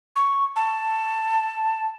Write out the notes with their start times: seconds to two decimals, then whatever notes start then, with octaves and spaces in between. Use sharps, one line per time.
0.16 C#6
0.56 A5